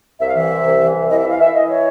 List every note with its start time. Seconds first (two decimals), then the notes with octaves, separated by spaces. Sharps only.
0.20 C2 E5
0.27 F5
0.34 E3 E5
0.51 C3
0.65 C2
0.80 E3
0.95 C2
1.10 E3 D#5
1.19 E5
1.24 E3
1.30 F5
1.39 E3 E5
1.54 E3 D#5
1.69 C#5